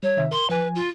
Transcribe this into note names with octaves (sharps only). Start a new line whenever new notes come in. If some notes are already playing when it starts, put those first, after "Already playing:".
G3 C#5
C3 D#3 E5
A#4 C6
F3 B4 G#5
F4